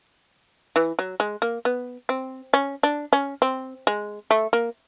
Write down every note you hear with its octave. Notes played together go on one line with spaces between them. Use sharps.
E3
F#3
G#3
A#3
B3
C4
C#4
D4
C#4
C4
G#3
A3
A#3